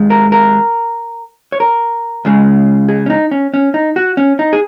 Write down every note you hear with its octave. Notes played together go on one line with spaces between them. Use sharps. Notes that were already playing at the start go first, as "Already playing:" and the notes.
Already playing: D#2 D#3 G#3
A#4
A#4
C#5
A#4
C#2 C#3 G#3
G#4
C#4
D#4
C#4
C#4
D#4
F#4
C#4
D#4
G#4